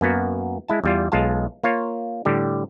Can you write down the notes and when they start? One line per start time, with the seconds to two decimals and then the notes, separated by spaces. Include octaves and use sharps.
0.01 F#2 A#3 B3 F#4
0.68 G#3 E4 A5
0.84 E2 G3 F4
1.12 B1 G#3 F4 F5 A5
1.64 A#3 F4 C#5
2.25 A2 D3 G3 G4